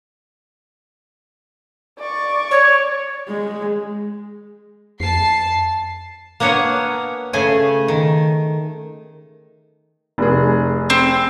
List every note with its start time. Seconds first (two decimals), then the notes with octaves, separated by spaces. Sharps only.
1.99 D5 C#6
2.51 C#5
3.28 G#3
5.00 F2 A5 C7
6.40 A#3 B3 D4 C#5 F#5 G#5
7.33 C#3 A3 G#4 G#5
7.88 D#3
10.18 F1 G#4
10.90 C4